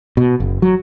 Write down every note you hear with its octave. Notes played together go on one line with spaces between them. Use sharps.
B2
F#1
F#3